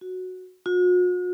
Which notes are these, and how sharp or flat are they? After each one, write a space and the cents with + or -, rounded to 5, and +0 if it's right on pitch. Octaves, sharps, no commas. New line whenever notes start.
F#4 -5
F#4 -45